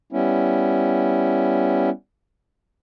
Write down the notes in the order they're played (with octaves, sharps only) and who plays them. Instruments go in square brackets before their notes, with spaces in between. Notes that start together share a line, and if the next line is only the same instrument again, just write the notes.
[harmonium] G3 B3 C#4 E4